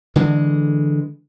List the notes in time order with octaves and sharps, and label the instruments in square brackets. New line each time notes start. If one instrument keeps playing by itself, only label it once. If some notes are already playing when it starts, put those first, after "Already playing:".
[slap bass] D3 E3 G#3